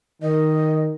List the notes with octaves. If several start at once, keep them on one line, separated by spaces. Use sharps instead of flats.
D#3 D#5